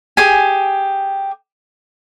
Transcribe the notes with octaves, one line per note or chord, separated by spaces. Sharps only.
G4 G#4 G#5